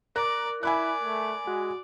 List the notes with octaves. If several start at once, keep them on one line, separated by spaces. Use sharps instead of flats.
A#4 D5 A#5 F#6
E4 D5 G#5 B5 F#6
A3
G#3 F#4